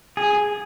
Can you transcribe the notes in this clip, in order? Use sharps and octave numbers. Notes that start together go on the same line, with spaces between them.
G#4